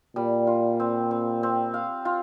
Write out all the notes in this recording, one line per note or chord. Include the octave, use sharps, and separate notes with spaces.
A#2 G3
F4
C4
C4
C4
F5
F4